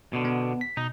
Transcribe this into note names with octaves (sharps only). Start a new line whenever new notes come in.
B2 D3
B3
B6
B2 D#4